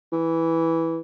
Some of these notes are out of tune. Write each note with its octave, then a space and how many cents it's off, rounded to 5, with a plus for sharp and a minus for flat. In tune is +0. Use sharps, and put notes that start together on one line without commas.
E3 -5